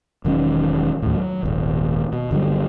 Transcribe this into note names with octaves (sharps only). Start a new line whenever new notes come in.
E1 D#3 F#3 C#4
D#2 A2
F#3
D#1 G#1
B2
G1 D3 F#3 G3